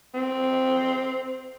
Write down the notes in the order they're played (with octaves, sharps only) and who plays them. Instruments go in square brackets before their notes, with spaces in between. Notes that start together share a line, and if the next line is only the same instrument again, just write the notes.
[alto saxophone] C4